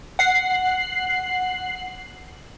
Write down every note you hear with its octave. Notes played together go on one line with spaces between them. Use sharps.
F#5 C7